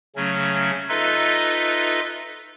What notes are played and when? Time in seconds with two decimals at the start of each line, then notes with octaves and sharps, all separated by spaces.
0.16 C#3 F#3 A3 C#4
0.89 D#4 F4 A4 B4 D#5 E5